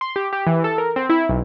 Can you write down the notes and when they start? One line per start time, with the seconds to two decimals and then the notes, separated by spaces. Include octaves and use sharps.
0.01 C6
0.16 G4
0.33 G4
0.47 E3
0.64 A4
0.78 A#4
0.96 C4
1.09 E4
1.29 B1